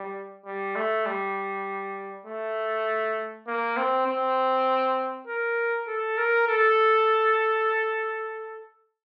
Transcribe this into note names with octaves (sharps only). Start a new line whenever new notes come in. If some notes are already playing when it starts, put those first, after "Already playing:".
Already playing: G3
G3
A3
G3
A3
A#3
C4
C4
A#4
A4
A#4
A4